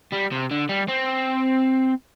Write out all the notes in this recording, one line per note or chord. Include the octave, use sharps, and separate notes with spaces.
G3
C3
D3
G3
C4